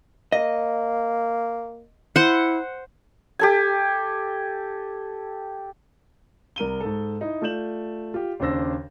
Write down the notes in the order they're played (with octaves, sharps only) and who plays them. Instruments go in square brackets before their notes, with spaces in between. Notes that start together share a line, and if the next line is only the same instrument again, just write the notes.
[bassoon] A#3 [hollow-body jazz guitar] D#5
[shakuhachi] E4 [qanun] C5 F#5
[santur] G4 A4 G#5
[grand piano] C2 A#4 D#7 G7
G#2 A4
D#4 E4
A3 F4 D5 G6 E7 F#7
F4 G4
D#2 C#3 D4 C5 E6 A#6